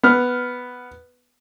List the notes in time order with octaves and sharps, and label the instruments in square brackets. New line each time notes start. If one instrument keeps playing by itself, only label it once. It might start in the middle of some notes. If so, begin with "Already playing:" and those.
[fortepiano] B3 F6